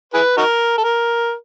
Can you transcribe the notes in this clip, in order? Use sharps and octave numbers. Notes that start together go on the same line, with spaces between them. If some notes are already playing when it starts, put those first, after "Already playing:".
E4 G#4 B4
D#4 F#4 A#4
A4
A#4